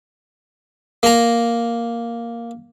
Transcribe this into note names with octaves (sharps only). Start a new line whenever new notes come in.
A#3 A#5